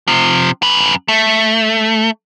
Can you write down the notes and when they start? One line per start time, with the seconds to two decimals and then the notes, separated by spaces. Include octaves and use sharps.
0.08 C3 F3
0.62 F#2 B4
1.08 A3